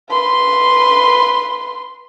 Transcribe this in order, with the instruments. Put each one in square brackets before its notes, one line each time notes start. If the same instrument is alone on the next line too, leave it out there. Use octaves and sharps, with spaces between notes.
[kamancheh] B4 C6